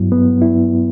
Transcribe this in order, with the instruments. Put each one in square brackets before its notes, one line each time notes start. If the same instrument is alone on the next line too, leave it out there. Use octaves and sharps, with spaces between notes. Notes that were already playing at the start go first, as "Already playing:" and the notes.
Already playing: [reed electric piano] G2 F#3 B3 E4
B3
E4